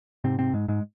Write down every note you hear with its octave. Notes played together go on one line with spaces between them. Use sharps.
G#2 C3 C4
C3 C4
G#2 G#3
G#2 G#3